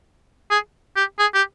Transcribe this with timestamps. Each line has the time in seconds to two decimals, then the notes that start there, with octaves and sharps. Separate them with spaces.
0.51 G#4
0.96 G4
1.19 G#4
1.35 G4